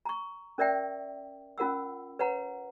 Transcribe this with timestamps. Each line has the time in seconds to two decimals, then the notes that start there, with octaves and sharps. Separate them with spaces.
0.05 A#5 C#6
0.58 C#4 A#4 D5 E5 G5
1.58 C#4 F4 A#4 F#5 E6
2.19 B4 C#5 F#5 A#5